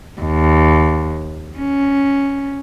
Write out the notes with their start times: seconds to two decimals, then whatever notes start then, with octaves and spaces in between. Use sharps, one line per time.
0.21 D#2
1.58 C#4